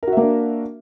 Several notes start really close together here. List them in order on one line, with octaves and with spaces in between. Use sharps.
A#4 F#4 E5 A#3 D4